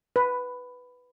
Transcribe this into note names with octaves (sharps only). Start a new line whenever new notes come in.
B4